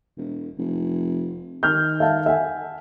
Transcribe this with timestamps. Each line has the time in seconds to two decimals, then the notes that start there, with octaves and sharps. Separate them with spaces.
0.17 E1
0.58 F1
1.63 D#3 F6 G6
2.00 E5 F5 A5
2.26 E5 F#5 G#5